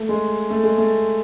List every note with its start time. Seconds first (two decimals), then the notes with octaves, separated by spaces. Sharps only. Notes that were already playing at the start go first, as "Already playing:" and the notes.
Already playing: A3
0.09 G#3
0.50 A3
0.63 G#3
0.78 A3